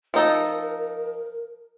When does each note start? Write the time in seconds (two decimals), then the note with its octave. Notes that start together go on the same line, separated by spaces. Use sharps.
0.14 F3 D#4 A4 A#4